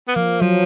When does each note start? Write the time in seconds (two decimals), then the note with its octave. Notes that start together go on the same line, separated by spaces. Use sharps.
0.08 B3
0.15 F3 A#3
0.41 F3 F#3